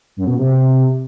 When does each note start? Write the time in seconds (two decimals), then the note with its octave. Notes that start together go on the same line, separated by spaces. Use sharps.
0.17 F#2
0.27 B2
0.38 C3